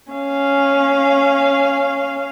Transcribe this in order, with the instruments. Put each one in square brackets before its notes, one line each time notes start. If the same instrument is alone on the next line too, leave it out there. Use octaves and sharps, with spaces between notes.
[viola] C#4 F5